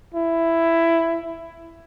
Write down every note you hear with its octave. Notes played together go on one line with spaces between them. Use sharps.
E4